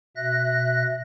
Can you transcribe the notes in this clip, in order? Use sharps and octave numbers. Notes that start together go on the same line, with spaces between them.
B2 E5 F#6 A#6